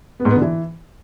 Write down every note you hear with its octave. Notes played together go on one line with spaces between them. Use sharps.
B3
G#2
B3
D3
E3